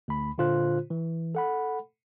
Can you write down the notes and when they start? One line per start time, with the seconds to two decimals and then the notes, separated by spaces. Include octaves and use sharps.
0.08 D2 B5
0.38 A#2 D3 F4 C5 F#6
0.90 E3
1.35 A4 F#5 B5